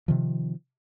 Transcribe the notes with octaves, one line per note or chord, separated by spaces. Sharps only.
C3 D#3 F3